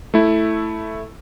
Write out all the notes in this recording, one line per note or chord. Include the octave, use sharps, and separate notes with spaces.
A3 E4